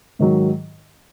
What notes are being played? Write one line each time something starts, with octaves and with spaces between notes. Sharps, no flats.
G#2 D#3 F#3